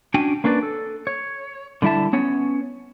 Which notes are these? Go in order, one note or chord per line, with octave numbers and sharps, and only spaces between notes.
C#4 D4 F#4 G5 G#5
A#3 C#4 D4 B4 D5
A4
C#5
D3 G3 E4 E5 A5
B3 C#4 C#5